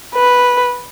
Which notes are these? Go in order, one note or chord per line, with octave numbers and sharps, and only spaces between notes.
B4